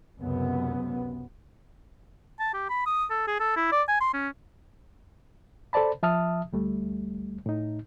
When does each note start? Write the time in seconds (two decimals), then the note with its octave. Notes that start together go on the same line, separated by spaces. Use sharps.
0.19 C#2 F#2 C3 B3
2.40 A5
2.54 G4
2.69 B5
2.86 D#6
3.10 A4
3.27 G#4
3.40 A4
3.57 E4
3.72 D5
3.88 G#5
4.01 C6
4.13 C#4
5.73 A4 C5 D5 A5 B5
6.03 F3 E5 A5 D#6 F6
6.53 D2 G3 A3
7.46 A2 D#4